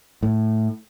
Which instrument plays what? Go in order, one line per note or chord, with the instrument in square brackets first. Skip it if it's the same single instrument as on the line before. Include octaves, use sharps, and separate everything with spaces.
[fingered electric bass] A2